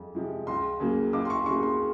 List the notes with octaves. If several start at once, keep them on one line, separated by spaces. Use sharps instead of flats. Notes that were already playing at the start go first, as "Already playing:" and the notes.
Already playing: F2 G#3
C3 F3 G#3
C#2 C6
C#3 F#3 A#3
C#2 D6
C6
C#6
C6
C#3 F#3 A#3 C#6
C6